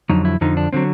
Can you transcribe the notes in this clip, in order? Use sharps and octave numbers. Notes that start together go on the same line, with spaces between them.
F2 D3 F#3 D#4
E4
F2 D3 F3 D#4
D4
D3 F#3 C4